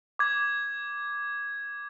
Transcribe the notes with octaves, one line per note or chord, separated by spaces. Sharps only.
D6 G#6